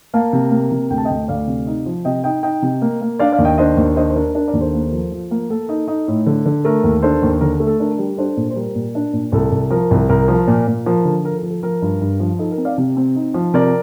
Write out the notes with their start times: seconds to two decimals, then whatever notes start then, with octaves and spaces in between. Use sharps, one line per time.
0.14 A#3 F5 A5
0.33 C3
0.51 A#3
0.71 C3
0.90 D2 G5
0.98 A5
1.05 D2 D#5 G5
1.28 D2 D5 F5
1.47 C3
1.67 D#4
1.86 F3
2.05 C3 D#5 G5
2.24 D#4 D#5 G5
2.43 D#4 D#5 G5
2.62 C3
2.82 A#3
3.01 A#3
3.19 D4 D5 F5
3.32 D5 F5
3.39 D#2
3.45 D#5 G5
3.58 D4 C5 D#5
3.77 D#2
3.96 D4 C5 D#5
4.09 C5
4.16 D4 A#4
4.34 D4 A#4
4.48 A#4 D5
4.53 D#2
4.61 A4 C5
4.74 A#3
4.92 F3
5.12 F3
5.31 A#3
5.50 A#3 A4
5.69 D#4
5.88 D#4
6.08 A2
6.26 D3
6.46 D3
6.65 A3 A#4
6.84 D#2
7.02 D4 A4 C5
7.23 D#2
7.41 D3 A#4
7.60 A3
7.67 A4
7.80 D4 A#4
7.98 G3
8.17 D4 A4 C5
8.37 A#2
8.50 C5
8.56 G3 A#4
8.75 A#2
8.95 D4
9.13 A#2
9.32 C2 A4
9.51 C2
9.70 F3 A#4
9.91 C2
10.09 C2 A#4
10.28 F3
10.47 A#2
10.67 A#2
10.86 F3 A#4
11.05 D3
11.24 F3 A#4
11.37 A4
11.43 F3
11.50 A4
11.63 F3 A#4
11.82 G2
12.01 G2
12.20 F3
12.39 D#4 A4
12.52 A#4
12.58 C4
12.65 D5 F5
12.78 C3
12.97 C4
13.15 D#4
13.34 F3
13.54 C3 A#4 D5